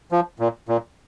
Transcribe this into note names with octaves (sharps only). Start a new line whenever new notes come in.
F3
A#2
A#2